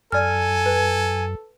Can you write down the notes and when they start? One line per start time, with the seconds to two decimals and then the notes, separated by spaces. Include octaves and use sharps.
0.12 F#2 A4 D5 G#5 F6
0.66 B4